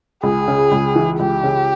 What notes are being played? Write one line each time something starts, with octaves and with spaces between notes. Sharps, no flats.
C#2 G#4
C#3
C#2
E3
C#2 G4
C#3